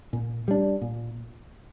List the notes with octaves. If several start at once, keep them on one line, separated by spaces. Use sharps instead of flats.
A#2
G3 D4
A#2